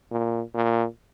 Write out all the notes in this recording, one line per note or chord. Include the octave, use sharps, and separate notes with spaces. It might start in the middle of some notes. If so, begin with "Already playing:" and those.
A#2
A#2